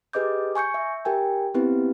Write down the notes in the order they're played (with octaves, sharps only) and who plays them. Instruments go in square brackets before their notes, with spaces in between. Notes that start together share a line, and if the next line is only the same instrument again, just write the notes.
[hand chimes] G4 G#4 B4 D#5 D6 G6
G#5 C#6 G6 C#7
E5
G4 A#4 G5 G#5
B3 C4 E4 G4 B4